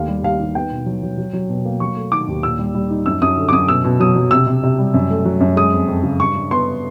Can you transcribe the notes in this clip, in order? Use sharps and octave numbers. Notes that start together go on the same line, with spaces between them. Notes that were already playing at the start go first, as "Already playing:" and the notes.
Already playing: D#2 A3 F5
G3
D#2 F5
D#3
B3 G5
B2
F#3
F#3
F#3
F#3
B2
A#3
F#3 C#6
A3
D#3 D6
D#2
A#2 E6
G3
G3
D#4
F#2 E6
F#2 D#6
D3
D6
F#2 D#6
B2 E6
B2
F#3 D#6
F#3
C3 E6
C3
C3
G3
F#2
A3
F#3
F#2
G#3 D#6
F2
F2
C#3
G2 C#6
G2
B3 C6